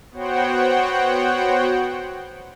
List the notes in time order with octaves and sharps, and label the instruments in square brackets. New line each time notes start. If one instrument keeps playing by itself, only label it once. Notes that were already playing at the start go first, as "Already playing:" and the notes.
[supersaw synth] B3 F#4 C5 C#5 F#5 G5